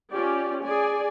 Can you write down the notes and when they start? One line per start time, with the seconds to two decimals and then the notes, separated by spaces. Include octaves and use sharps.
0.13 C#4 F4 G4 D5
0.64 G#4 D5 G#5